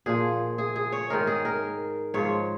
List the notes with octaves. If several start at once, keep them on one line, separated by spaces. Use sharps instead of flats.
A#2 F3 G#4
G#4
G#4
C#5
G#2 D#3 A#4
G#4
A#4
G#2 F3 C#5